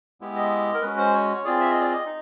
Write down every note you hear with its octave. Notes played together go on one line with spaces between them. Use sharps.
G#3 B3 E4 G4
D#5
A#4
G#3 C#4 F#4 B4
C5
C#5
C4 F4 G#4 D5
E5
D#5
D5
D#5
D#4